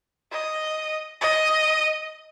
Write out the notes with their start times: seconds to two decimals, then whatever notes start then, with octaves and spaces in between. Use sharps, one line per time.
0.32 D#5
1.21 D#5